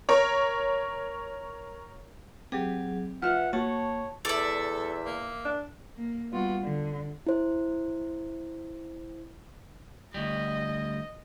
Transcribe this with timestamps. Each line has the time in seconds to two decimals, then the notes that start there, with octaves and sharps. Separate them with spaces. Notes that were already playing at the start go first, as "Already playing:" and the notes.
0.09 A#4 C#5
2.52 F#3 C4 G4 G#4
3.22 F3 B4 E5 F#5 F6
3.53 A#3 F#4 C#5 A5
4.25 E2 A4 D5 E5
5.05 A#3
5.45 D4
5.96 A#3
6.32 G3 B3 F4 F#4
6.63 D3
7.27 E4 C5
10.14 D2 G3 D#5